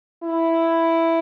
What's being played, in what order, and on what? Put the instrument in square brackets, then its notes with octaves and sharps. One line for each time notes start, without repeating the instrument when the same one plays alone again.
[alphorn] E4